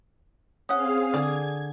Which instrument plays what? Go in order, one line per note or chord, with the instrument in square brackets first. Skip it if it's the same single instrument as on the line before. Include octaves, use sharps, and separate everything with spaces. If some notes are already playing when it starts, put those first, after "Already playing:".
[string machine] C4 G#4 F5 [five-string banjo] C#4 F#5 [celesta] D#6
[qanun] D3 G#4 [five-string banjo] D5 [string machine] G#6